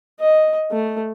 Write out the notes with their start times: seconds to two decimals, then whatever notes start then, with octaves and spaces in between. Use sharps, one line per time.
0.20 D#5
0.71 A3